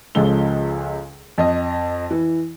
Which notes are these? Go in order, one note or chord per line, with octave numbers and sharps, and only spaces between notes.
C#2 C#3 F3 G#3 A4 G7
F2 D#5
E3